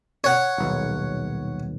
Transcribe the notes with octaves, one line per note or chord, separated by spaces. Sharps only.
C#5 F#5
D#1 B1